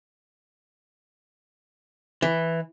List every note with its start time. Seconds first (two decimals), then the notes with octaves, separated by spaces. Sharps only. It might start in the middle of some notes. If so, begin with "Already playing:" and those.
2.22 E3